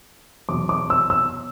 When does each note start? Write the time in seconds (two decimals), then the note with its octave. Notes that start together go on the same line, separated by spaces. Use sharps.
0.49 E2 B2 F#3 D6
0.69 D6
0.90 E6
1.10 E6